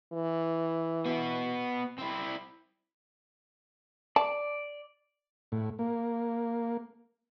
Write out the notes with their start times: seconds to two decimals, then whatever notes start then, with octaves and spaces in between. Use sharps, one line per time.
0.13 E3
1.06 B3 F#4
1.98 C4 E4
4.16 D5 A5
5.52 A2
5.79 A#3